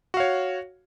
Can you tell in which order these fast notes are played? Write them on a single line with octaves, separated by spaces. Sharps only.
F#4 F5 C#5